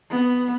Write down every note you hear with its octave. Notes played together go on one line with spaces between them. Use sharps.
B3